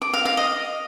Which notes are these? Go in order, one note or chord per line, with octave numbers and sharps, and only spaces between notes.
D6
F5
F5
D#5